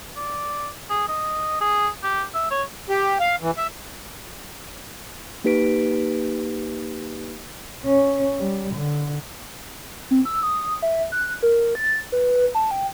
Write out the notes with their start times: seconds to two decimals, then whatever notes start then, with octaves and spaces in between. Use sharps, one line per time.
0.17 D5
0.90 G#4
1.08 D#5
1.61 G#4
2.03 G4
2.34 E5
2.51 C#5
2.89 G4
3.20 F5
3.41 E3
3.57 E5
5.44 A#3 D#4 G4 B4 B6 D7
7.85 C#4
8.38 G3
8.75 D3
10.11 C4
10.25 E6
10.43 D#6
10.82 E5
11.12 F#6
11.43 A#4
11.75 A6
12.12 B4
12.55 A5
12.71 G5